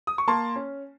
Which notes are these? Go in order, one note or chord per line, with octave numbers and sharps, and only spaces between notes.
D#6
C#6
A#3 A5 C6
C#4